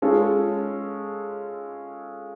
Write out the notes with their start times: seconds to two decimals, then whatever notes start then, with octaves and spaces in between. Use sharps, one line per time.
0.02 G#3 C#4 F4 A4